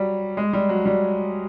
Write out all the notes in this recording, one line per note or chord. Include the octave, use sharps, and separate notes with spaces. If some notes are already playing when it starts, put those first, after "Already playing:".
Already playing: F#3 G3
G#3
G3
F#3
G3